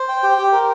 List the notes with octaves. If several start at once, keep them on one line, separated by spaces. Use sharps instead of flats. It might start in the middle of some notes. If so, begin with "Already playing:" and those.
Already playing: C5
G5
G4
G4
A#4